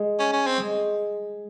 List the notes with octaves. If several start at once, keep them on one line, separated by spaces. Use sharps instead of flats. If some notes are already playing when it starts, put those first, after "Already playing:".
Already playing: G#3
C#4
C#4
C4
G#3